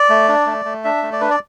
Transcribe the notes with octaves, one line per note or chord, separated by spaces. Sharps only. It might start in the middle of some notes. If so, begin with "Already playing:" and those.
Already playing: D5
A3
D4
A3
A3
D4 E5
A3
D5
D4 B4
D5